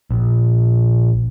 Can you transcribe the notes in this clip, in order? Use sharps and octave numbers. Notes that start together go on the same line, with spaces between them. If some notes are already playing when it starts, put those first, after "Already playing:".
A#1